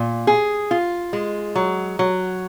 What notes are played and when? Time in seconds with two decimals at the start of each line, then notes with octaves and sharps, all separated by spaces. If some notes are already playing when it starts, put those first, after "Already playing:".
Already playing: A#2
0.27 G#4
0.71 F4
1.13 G#3
1.55 F#3
1.99 F#3